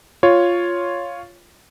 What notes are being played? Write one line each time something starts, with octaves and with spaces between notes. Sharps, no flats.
F4 C#5